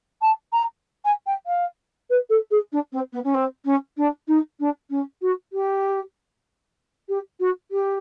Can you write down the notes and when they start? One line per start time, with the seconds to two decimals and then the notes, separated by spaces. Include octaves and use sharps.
0.21 A5
0.53 A#5
1.05 G#5
1.26 G5
1.46 F5
2.10 B4
2.29 A4
2.51 G#4
2.72 D4
2.92 C4
3.12 B3
3.24 C#4
3.34 C4
3.65 C#4
3.97 D4
4.27 D#4
4.59 D4
4.90 C#4
5.21 F#4
5.52 G4
7.08 G4
7.40 F#4
7.71 G4